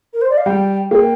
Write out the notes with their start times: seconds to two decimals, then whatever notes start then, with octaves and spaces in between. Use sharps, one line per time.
0.13 A#4
0.21 C5
0.30 D5
0.37 F5
0.46 G3 G5
0.91 A#3 G5